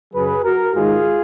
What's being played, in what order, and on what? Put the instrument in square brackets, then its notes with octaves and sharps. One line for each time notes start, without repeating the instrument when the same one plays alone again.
[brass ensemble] F#2 C#3 F#3 G#4 B4
F#4 A#4
G#2 D#3 G#3 F4 G#4